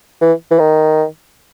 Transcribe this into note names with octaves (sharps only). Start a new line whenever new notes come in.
E3
E3
D#3